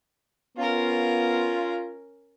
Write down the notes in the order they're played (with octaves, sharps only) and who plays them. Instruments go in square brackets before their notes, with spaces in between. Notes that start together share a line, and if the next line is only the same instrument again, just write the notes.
[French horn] B3 [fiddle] C#4 A#4 [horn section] F4